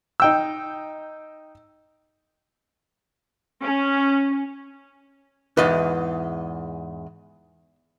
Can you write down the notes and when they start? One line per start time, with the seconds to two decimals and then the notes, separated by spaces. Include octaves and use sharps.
0.20 D#4 G5 E6
3.63 C#4
5.57 E2 G#2 B4 D#5